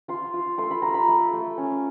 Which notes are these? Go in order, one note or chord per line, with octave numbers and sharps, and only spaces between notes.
F4 C6
F4
A3 C6
B5
F4 A#5
B5
A3
A3
C#4